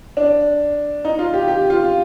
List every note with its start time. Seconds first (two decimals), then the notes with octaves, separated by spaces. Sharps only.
0.17 D4
1.05 D#4
1.19 F4
1.34 G4
1.48 G4
1.70 F4